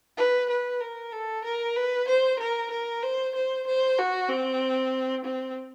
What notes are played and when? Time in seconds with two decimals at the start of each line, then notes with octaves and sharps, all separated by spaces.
0.17 B4
0.49 B4
0.81 A#4
1.12 A4
1.44 A#4
1.76 B4
2.08 C5
2.39 A#4
2.71 A#4
3.03 C5
3.35 C5
3.67 C5
3.98 F#4
4.29 C4
5.25 C4